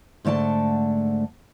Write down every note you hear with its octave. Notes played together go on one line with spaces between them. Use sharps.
G#2 D3 A3 D5 A5